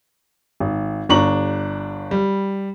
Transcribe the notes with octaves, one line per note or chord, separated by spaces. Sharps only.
G#1
G1 D4 A#5 C#6 F#7
G3